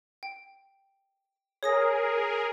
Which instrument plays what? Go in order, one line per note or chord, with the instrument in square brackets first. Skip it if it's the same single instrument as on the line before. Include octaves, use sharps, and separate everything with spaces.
[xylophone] G5
[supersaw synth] G#4 A#4 [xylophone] C#5 D#6 A#6